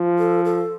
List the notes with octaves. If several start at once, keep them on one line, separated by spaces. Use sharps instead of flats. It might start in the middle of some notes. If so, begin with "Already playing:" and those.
Already playing: F3
A4
A4